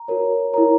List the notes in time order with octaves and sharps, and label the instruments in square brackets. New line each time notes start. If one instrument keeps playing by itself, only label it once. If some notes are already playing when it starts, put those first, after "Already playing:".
Already playing: [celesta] A#5
F#4 A#4 C#5
E4 A#4 C#5 A#5